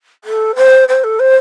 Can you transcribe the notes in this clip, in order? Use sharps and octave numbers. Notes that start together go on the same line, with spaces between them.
A4
C5
C5
A4
C5